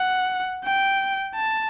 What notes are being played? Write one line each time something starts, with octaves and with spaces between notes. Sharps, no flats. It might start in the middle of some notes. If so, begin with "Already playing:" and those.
Already playing: F#5
G5
A5